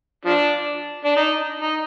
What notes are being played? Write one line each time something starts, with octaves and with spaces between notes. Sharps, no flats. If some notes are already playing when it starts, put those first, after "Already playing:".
F3 D4
D4
D#4
D#4